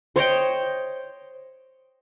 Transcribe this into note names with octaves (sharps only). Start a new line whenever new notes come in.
C5 C#5 D#5 G5